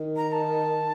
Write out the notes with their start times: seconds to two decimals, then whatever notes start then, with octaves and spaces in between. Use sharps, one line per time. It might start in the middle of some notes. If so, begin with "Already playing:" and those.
Already playing: D#3
0.16 A#5
0.32 A5